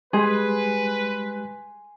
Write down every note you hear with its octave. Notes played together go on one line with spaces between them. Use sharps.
G3 G#3 G4 G#4 B4 G#5 C6